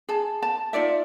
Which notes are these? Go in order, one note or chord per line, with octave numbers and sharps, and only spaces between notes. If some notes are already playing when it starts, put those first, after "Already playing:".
G#4 A5
A5
D#4 F4 D5 E5